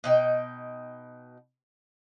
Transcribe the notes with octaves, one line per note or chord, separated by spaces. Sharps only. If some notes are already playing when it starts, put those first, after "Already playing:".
B2 D#4 G5